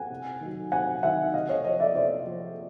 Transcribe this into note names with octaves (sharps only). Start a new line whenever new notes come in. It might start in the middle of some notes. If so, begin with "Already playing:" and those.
Already playing: F#5 G#5
C3
D#3 F#3
C3 F#5 G#5
D#3 F#3 E5 F#5
C3 D#5 F5
C#5 D#5
F3 C#5 D#5
D5 E5
C3 C5 D5
F3